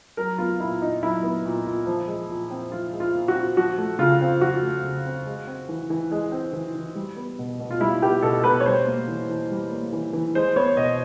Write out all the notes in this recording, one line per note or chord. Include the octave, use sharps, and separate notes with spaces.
F#3 A#4
B3 F4
A#2 E4
A#2 D#4
F#3 E4
B3
A#2
A#2
F3
G#3
A#2
C4
F3 F4
G#3
F4
A#2
F#4
C4
F3 F#4
A3
C#3 F4
C4
F3 F#4
A3
C#3
C4
G#3
C4
E3
E3
G#3
C4
E3
E3
G3
B3
B2
B2
F4
G3 E4
B3 G4
B2 A4
B2 B4
C#5
G3 C5
A#3
E3
E3
G3
A#3
E3
E3
G#3 C5
B3 C#5
B2 D#5